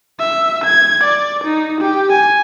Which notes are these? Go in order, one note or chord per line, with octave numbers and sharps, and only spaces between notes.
E5
G#6
D5
D#4
G4
G#5